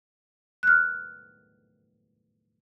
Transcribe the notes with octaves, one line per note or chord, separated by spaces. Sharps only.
F6 F#6